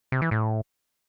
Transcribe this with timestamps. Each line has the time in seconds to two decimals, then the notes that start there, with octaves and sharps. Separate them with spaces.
0.12 C3
0.22 E3
0.31 A2